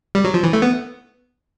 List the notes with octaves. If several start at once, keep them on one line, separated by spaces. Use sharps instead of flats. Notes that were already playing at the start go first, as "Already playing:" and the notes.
G3
F#3
F3
E3
A3
B3